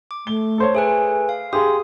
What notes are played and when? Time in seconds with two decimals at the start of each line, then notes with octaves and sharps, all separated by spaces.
0.11 D6
0.27 A3 G7
0.58 A4 C5 C#5
0.75 A3 G#4 A4 B4 G#5
1.29 F5
1.53 G4 G#4 F5 C6 D#6